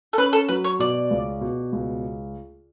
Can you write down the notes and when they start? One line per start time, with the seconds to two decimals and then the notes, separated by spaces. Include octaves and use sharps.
0.13 A4
0.18 C#4 B4
0.33 A4
0.48 F#3 B4
0.64 C#5
0.79 B2 D5
1.11 C#2
1.41 B2
1.72 C#2